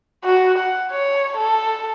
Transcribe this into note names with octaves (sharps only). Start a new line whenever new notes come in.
F#4
F#5
C#5
A4